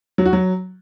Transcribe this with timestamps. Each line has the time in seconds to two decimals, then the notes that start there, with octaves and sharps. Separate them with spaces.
0.18 F#3
0.26 F#4
0.33 F#3